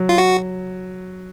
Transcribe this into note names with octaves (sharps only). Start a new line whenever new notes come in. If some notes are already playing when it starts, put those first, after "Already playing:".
Already playing: F#3
F4
F#4